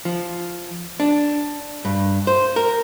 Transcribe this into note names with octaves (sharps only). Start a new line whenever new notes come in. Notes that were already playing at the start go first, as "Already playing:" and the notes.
F3
D4
G2
C5
A#4